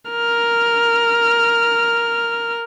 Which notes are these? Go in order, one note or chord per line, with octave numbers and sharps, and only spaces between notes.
A#4 F6